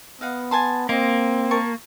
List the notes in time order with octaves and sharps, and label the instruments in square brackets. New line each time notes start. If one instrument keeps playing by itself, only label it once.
[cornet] B3 [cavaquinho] D#5 F5 F#5
[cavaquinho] G#5 A5 C6
[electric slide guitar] A#3 [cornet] C4 [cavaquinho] D#5 C6
[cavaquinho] A#4 A5 C#6